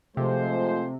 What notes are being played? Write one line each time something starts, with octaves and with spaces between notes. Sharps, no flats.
C3 F3 G#3 A3 C5